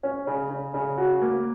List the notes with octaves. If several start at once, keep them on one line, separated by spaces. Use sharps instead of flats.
C#4
C#3
C#3
C#3
F#4
A#3